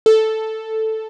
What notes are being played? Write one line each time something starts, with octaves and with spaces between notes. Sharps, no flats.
A4